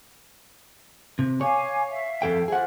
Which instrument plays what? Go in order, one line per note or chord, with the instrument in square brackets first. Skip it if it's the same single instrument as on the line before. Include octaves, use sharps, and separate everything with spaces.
[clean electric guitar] C3
[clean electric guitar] C#5 [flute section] F5 G#5 D6
[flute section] E5 F5
[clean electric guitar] F2 A4 G5
[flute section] F4 C5 E5 [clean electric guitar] G#4 F#5